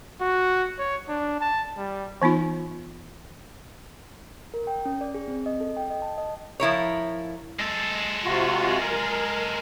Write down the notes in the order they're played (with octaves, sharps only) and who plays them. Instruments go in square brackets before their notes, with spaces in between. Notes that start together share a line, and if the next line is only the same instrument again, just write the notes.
[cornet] F#4
C#5
D4
A5
G3
[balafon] E3 B3 D#4 F4
[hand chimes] A#4
G5
C#4
D5
G#4
C4
D#5
A4
G5
D#5
A5
D#5
[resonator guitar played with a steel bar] F3 E4 A#4 C#5
[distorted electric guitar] G#3 A4
[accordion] C3 F4 F#4
A#4